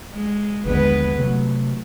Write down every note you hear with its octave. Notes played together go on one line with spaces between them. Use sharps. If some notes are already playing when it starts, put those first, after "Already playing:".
G#3
A#1 D#2 D3 G#3 B3 B4
C3 F#3 A3